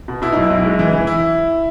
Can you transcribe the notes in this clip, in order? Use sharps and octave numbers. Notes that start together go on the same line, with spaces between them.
B2
B2 E4
B1 D#4
E4
B1
G#3
E3
E3
E4